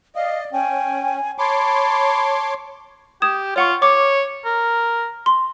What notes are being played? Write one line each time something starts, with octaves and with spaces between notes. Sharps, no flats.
D5 D#5 F5
C#4 G5 G#5
C#5 A5 B5 C6 D6
G4 D#6 G#6 E7
F4 C#5 F#5 C#6
C#5 D6
A#4
C6